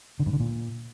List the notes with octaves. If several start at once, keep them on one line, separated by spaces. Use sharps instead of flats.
D3
G2
D3
A#2